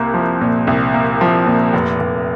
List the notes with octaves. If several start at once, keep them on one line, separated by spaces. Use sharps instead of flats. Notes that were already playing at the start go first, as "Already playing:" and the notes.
Already playing: C2 A#3
F3
A#2
C2
A#3
F3
A#2
F1
F1